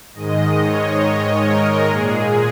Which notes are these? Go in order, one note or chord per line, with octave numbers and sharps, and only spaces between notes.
G#2 D#3 G#3 D#5
C#5
A#4
A#2 G#3 G#4